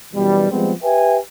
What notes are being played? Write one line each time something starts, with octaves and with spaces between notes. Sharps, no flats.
F#2 B2 E3 G3
F3 G3 G#3 B3 C4
G4 B4 E5 G5 G#5